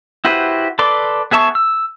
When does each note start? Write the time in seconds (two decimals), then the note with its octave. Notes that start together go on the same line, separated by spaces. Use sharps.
0.25 E4 F#4 G4 B4 C5
0.79 A4 B4 D5 C6 D6
1.31 B3 G#4 E5 A5 C#6
1.55 E6